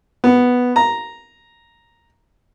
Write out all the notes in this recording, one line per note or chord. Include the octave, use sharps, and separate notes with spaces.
B3
A#5